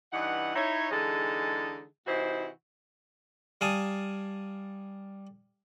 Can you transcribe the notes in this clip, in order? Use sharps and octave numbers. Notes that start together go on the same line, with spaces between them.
G2 E3 D#4 F#5
D#4 E4 C#5
D3 E3 G#3 D#4 G#4 A4
C3 E3 D#4 E4 F#4 C5
G3 F5 G#5 A5 D#6